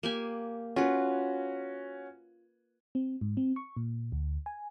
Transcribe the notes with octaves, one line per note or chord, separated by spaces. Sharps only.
A#3 G4 G#5
C#4 F4 F#4 B4
C4
G#2
C4
C#6
A#2
D2
G#5